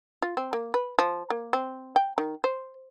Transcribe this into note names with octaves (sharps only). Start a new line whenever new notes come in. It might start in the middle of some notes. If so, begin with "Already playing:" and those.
F4
C4
A#3
B4
F3
A#3
C4
G5
D#3
C5